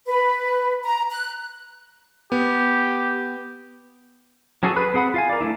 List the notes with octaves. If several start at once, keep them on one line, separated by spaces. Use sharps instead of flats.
B4
A#5
F#6
B3 G4
F#3 C#4 F#4 G#4 A4
G#4 A4 B4 B5 F#6
C4 G#4 F#5 B5
F4 F5 G#5
A#4 D5
A3 C#4 D4 E4